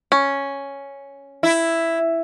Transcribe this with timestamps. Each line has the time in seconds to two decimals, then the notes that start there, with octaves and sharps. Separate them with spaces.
0.12 C#4
1.43 E4